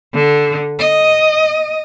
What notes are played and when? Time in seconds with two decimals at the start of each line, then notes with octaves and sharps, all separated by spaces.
0.14 D3
0.80 D#5